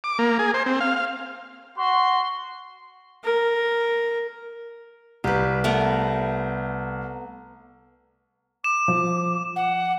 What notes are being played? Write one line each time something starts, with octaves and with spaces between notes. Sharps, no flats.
D6
A#3
G#4
C5
C4
F5
F5
F#4 C6
A#4
C2 G4 B4
A3 B3 A#4
D6 E7
F3
F#5